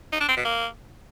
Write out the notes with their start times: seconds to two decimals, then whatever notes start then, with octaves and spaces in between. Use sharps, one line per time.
0.12 D#4
0.20 D4
0.29 C4
0.37 B2
0.45 A#3